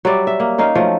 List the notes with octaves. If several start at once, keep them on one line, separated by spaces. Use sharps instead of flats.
F#3 G3 D5 E5
E5
A#3
C#4 D#4 A#4 F5
F3 F#3 A3